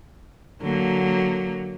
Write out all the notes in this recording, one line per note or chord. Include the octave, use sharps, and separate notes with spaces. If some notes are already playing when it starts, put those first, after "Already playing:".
D3 F#3 A#3